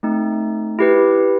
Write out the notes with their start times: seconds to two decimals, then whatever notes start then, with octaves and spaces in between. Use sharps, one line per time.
0.03 A3 C4 D#4
0.79 E4 G4 B4